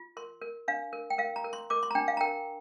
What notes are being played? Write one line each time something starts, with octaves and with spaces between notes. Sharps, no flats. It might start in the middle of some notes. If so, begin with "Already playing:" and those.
Already playing: F4
A#4 C6
A#4
D4 F5
A#4
G5
A#4 F5
A#5
A#4
C6
A#4 D6
C6
A#5
D4 G5
F5
A#5
A#4 G5